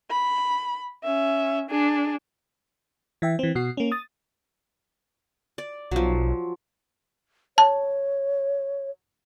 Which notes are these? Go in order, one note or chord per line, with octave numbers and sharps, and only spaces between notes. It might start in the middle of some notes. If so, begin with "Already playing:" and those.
B5
C#4 E5
D4 G#4
E3 E5 G5
E3 C4
B2 F#4 C7
A#3 C#4
D#6 A6
D5
B1 F3 F#3
C#5 A5